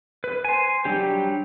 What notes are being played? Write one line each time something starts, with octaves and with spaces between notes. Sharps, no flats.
B4
C5 G#5
F#3 G3 D4 G4